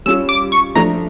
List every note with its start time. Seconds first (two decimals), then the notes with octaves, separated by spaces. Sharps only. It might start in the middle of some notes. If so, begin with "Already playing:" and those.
0.06 G3 C#4 F4 E6
0.29 D6
0.52 C#6
0.75 F3 A3 D4 A#5